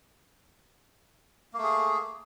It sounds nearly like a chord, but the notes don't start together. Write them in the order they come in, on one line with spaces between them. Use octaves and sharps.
A#3 A3 G#4